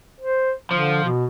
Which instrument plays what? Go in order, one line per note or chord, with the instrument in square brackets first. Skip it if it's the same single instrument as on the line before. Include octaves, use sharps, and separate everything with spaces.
[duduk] C5
[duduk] D3 [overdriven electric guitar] F3
[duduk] B2